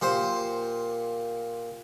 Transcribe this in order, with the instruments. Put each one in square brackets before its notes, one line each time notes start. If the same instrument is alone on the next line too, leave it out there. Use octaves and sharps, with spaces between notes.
[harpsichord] A#2 G4 C5